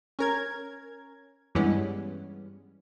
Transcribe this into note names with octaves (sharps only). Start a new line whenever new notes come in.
C#4 A#4 G#6
G2 E3 G3 G#3 B3 C#4